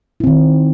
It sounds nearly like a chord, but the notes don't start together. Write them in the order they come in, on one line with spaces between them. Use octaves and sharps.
E4 C4 D#3